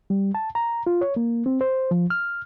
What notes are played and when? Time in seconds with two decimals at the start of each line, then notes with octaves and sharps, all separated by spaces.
0.10 G3
0.35 A5
0.55 A#5
0.87 F4
1.01 C#5
1.16 A#3
1.46 C4
1.61 C5
1.91 F3
2.10 F6